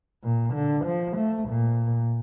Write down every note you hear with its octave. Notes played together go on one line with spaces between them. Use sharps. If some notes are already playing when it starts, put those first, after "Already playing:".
A#2
D3
F3
A3
A#2